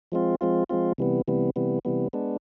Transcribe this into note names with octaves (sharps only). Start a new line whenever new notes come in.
F3 G#3 C4 F4
F3 G#3 C4 F4
F3 G#3 C4 F4
C3 E3 G3 B3
C3 E3 G3 B3
C3 E3 G3 B3
C3 E3 G3 B3
G#3 B3 D4